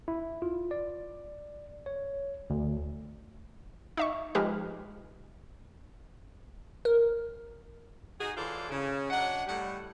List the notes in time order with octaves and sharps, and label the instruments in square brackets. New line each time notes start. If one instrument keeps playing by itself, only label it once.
[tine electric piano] E4
F4
D5
C#5
D2
[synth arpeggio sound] D#4 E5 C#6
F3 G#3 D#4 G4 B4 F6
[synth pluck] A#4
[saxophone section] D#4 F#4 G#4
E3 F#3 F4 A4 C5 D5
C#3
F#3 D4 D#5 F#5
A2 G3 F#5